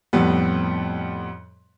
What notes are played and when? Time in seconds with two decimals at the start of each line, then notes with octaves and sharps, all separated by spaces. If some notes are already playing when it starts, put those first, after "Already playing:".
0.13 F2 A2 G3 B3